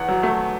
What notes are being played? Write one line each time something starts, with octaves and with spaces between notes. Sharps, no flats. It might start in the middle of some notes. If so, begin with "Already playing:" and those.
Already playing: E2 F#5
F#3
A3